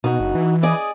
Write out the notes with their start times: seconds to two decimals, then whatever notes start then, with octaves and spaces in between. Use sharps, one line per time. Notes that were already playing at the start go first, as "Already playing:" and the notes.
0.04 B2 D#4 F#4
0.20 F#1
0.35 E3
0.63 G#4 D5 D#5